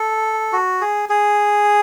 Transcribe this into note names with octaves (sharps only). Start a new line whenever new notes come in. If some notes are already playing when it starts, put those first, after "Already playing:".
Already playing: A4
F#4
G#4
G#4